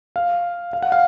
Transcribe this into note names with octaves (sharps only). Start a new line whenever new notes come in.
F5
F5
F#5
F5